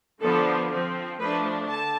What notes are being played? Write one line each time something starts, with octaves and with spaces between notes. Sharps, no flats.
D3 F3 B3 D4 A4
F3 C4
F3 A3 D4 B4
D3 A5